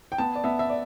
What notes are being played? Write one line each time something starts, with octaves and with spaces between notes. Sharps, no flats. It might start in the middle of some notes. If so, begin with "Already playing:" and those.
G5
B3 A5
D5
B3 E5
E5
D5